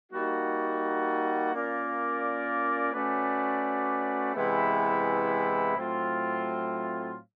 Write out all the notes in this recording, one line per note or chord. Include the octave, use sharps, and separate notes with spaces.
G3 A#3 D#4 F#4
A#3 C#4 F4 A#4 D5
A3 C#4 F#4 B4 D5
C3 E3 G#3 B3 E4
A2 F#3 A3 C4 F4